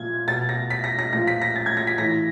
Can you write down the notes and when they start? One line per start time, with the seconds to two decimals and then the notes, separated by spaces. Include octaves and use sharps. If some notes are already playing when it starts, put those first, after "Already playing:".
Already playing: A#2 F3 G#6
0.28 B2 A6
0.49 A#6
0.70 B6
0.84 A#6
0.99 A#6
1.13 A#2 F3 A#6
1.28 B6
1.42 A#6
1.56 A6
1.66 G#6
1.77 A#6
1.87 B6
1.98 A2 E3 A#6